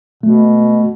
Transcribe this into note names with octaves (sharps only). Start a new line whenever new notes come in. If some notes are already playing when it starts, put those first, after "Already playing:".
B2 A3